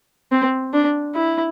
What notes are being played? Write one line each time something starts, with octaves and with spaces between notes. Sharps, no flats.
C4
D4
E4